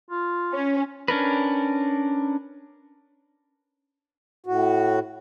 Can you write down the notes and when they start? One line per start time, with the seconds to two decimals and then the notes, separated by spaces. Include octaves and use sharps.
0.10 F4
0.53 C#4
1.08 C#4 D4 A#4 B4
4.46 A2 F#4